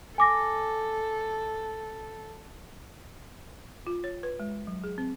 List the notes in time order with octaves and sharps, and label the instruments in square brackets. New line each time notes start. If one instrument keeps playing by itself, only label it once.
[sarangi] A4 [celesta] G#5 D6 A#6
[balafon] F4
C#5
B4
G#3
F#3
G#4
C4